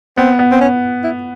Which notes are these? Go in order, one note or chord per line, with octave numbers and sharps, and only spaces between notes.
B3 C4
B3
C4
C#4
E4